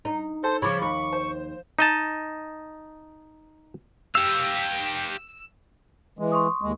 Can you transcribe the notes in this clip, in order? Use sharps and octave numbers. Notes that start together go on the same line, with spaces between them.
D#4
A4 C5
C#3 F3 C#5 B5 D6
D#2 C#6
C5
D#4 D#5 A5
G4 F5 E6
E3 G#3
C6 C#6 D#6
D#2 G#3